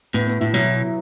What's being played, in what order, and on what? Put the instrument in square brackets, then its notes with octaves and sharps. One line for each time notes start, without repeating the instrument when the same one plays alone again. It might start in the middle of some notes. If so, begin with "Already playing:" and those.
[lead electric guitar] A2 [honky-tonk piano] B3
[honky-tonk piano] B3
[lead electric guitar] A2 [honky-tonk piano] E4
[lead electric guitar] B2 [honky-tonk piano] F#3